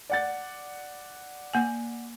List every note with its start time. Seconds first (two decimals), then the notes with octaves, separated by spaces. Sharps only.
0.10 D5 F#5 A6
1.53 A#3 G#5